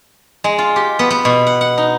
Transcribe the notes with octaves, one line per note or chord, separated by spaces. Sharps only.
G#3
F4
G4
B3
B3
B2
F#5
F#5
D#4